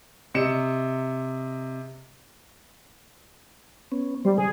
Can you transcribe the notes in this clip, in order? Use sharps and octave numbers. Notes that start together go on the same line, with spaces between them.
C3 D#5 C#7 E7
B3 C#4
G3 C5
C#3 G#4